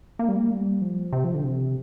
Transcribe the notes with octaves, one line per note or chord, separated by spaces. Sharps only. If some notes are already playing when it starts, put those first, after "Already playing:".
A#3
G3
A#3
G3
F3
C3
F3
D3
C3